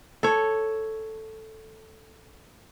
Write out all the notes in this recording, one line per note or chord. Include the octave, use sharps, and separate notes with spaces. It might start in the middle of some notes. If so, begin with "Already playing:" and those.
A4 C#5